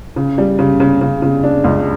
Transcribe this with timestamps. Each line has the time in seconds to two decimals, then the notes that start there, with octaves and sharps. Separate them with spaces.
0.16 C#3
0.38 G3
0.59 C#3
0.80 C#3
1.01 C#3
1.22 C#3
1.44 D4
1.64 C#2